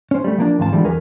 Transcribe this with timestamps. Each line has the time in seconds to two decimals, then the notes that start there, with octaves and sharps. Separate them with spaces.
0.11 C#4 C5
0.24 G3 A3
0.38 F3 A#3 D4
0.59 D2 G#2 E3 C4 F5 A5
0.72 D3 E3 F3 G3 G#3
0.84 E2 G#4 A#4 B4